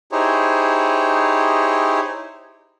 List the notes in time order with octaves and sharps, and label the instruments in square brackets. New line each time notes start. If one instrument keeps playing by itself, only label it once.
[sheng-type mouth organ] D#4 E4 G4 G#4 C5 C#5